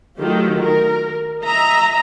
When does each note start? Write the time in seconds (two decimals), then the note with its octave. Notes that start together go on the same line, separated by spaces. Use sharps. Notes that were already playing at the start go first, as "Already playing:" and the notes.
0.20 D#3 F#3 A3 F4 G4
0.63 A#4
1.43 D#5 E5 A#5